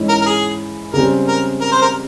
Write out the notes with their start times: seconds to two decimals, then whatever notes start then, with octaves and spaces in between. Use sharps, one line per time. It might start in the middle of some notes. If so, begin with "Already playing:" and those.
Already playing: G#2 E3 G#3 C#4 E4
0.09 A#4
0.22 A#4
0.26 G#4
0.93 C#3 G3 C4 A#4
1.28 A#4
1.61 A#4
1.72 C5
1.82 A#4